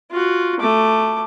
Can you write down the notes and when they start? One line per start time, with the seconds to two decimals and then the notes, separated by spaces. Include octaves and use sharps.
0.11 F4 F#4
0.60 A3 D6